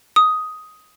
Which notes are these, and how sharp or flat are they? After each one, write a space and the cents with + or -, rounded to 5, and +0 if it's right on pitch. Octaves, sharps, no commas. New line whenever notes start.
D#6 +10